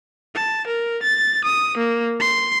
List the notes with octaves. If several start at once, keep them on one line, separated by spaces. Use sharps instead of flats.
A5
A#4
A6
D#6
A#3
C6